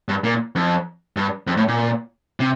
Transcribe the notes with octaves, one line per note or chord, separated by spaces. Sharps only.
G2
A#2
F2
G2
F2
A2
A#2
C3